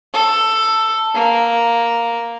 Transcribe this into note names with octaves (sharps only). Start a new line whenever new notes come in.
A4
A#3